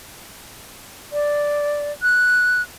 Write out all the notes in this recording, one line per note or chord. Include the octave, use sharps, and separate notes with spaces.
D5
F#6